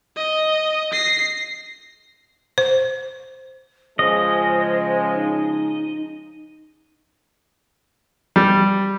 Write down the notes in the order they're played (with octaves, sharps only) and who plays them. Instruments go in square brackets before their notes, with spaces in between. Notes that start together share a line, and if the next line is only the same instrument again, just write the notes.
[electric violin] D#5
A#6 C7
[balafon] C5
[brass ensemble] C#3 F3 G#3 [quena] C5 [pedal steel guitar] D#5
[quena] D#4
[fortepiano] G3